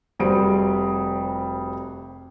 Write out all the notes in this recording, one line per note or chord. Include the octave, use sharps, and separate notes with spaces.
F1 G3 F#4 G#4 C5 D7